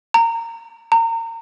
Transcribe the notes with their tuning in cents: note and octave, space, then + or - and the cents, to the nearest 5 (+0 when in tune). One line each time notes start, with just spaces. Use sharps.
A#5 -20
A#5 -30